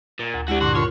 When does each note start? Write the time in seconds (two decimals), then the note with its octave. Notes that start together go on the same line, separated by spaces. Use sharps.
0.19 A#2
0.34 D2
0.48 G#3 D4 E4 F#4 G4
0.61 G2 A#2 D3 F#4 C6
0.76 F4 A#4 C#5